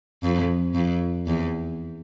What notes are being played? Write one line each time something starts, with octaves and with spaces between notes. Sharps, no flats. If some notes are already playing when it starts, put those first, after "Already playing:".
F2
F2
E2